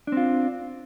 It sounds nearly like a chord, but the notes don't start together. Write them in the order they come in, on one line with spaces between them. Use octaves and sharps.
D4 C4 F4